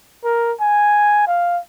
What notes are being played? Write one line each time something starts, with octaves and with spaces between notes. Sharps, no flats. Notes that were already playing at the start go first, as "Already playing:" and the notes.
A#4
G#5
F5